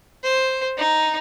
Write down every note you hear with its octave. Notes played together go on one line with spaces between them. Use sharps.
C5
D#4